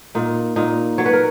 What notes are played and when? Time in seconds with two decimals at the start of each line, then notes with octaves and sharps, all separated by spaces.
0.15 A#2 D#4
0.56 A#2 D#4
0.98 F#3 C#5
1.06 B4
1.13 A#4